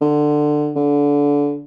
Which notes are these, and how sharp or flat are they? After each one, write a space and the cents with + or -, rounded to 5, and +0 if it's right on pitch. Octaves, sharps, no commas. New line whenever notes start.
D3 +20
D3 -25